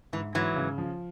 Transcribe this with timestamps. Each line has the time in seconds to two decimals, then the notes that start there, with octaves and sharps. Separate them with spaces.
0.13 G#2 E3
0.34 G#2 E3 F#3
0.56 C#3
0.78 F3